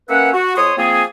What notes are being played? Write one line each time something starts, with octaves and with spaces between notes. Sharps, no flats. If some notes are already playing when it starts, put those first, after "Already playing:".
A#3 C#4 B4 E5 F#5
F#4
F2 C#5 C6 D#6
F3 A#3 C4 G#4